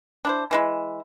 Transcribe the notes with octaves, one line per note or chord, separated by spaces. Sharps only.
D4 E4 C5
E3 G#3 E4